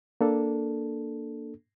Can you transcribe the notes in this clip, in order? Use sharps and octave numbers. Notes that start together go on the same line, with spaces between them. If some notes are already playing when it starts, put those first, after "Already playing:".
A#3 D4 A4